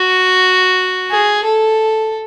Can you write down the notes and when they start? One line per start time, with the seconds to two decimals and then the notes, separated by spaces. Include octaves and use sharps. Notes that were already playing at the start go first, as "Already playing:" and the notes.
Already playing: F#4
1.11 G#4
1.44 A4